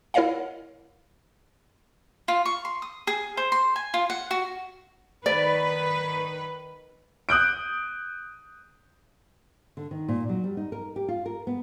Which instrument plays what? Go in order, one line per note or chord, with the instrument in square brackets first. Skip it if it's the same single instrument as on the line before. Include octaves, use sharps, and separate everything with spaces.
[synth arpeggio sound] E4 A#4 C#5 D#5 F5 F#5
[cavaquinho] F4
C#6
C6
D#6
G#4
C5
C6
G#5
F4
F#5
F#4
[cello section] D#3 B4 [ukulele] D5
[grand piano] D#6 F#6 G6 D7
[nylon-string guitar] D3
D#3
A#2
F#3
G3
D#4
A#4
G4
F4
A#4
B3